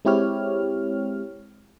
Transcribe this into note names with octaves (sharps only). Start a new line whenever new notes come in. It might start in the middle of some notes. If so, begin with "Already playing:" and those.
G#3 C4 E4 G4 C#5 F6